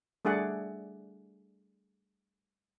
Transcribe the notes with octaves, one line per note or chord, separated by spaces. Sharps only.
G3 A3 D4 G#4 D5 F#5